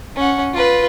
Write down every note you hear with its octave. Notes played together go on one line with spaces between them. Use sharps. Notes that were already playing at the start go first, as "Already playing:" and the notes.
C#4 F#5
F4 B4